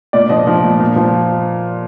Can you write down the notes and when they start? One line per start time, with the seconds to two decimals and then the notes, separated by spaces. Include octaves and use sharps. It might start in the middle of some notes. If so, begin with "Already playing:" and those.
0.13 A#2 D5
0.29 F3 D#5
0.46 F3 D#5
0.64 A#2
0.80 A#2
0.96 F3